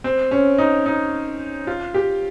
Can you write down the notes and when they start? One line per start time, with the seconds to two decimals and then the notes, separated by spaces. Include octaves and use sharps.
0.04 C4
0.31 C#4
0.58 D#4
0.86 D#4
1.67 F4
1.94 G4